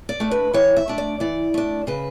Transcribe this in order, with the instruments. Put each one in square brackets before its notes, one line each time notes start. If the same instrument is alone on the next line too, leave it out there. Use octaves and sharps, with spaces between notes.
[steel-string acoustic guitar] D5
A3 D4
B4
E3 C#5
E5
A3 D4
D5
E3 D5
A3 D4
C#3 B4